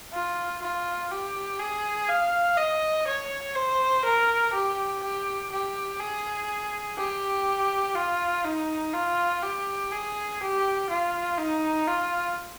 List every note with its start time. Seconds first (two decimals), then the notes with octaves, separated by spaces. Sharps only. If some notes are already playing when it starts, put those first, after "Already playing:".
0.12 F4
0.62 F4
1.11 G4
1.59 G#4
2.08 F5
2.57 D#5
3.07 C#5
3.55 C5
4.04 A#4
4.53 G4
5.03 G4
5.52 G4
6.00 G#4
6.97 G4
7.95 F4
8.45 D#4
8.93 F4
9.42 G4
9.91 G#4
10.41 G4
10.89 F4
11.38 D#4
11.87 F4